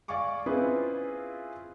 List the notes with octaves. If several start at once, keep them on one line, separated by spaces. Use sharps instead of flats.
D5 D#5 F5 G#5 C#6 D6
C4 C#4 E4 F4 G#4 B4